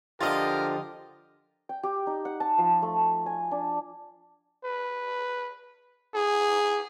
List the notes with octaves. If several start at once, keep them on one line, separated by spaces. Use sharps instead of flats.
D3 F3 F4 G4 A#4 D#5 A6
G5
G4
D#4
F#5
A5
F3
A3
G#5
D4
B4
G#4